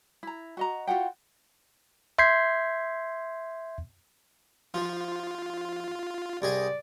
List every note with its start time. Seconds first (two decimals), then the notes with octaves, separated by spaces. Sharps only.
0.23 E4 A#5
0.57 F#4 D#5 A#5
0.87 F4 F#4 F#5 G5
2.18 E5 C6 G6 G#6 B6 C7
4.74 F3 F4
6.42 C2 G#4 D5 D#5